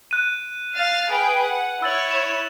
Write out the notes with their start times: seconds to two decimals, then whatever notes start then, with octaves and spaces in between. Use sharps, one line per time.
0.11 F#6 D#7
0.75 F5 F6 A6
1.07 G#4 B4 G5
1.43 F#5
1.82 E4 C#5 E6 A6 F#7
2.11 E7